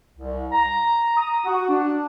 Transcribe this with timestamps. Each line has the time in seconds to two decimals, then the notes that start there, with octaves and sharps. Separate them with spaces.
0.18 C2
0.52 A#5
1.17 D#6
1.45 F#4
1.69 D4